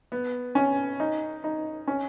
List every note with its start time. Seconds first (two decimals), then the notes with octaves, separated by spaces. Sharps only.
0.12 B3
0.55 C#4
1.00 D#4
1.44 D#4
1.88 C#4